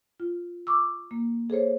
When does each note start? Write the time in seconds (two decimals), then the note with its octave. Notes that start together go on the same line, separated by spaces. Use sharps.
0.20 F4
0.67 C#6 D6 E6
1.11 A#3
1.50 G#4 A4 C5 C#5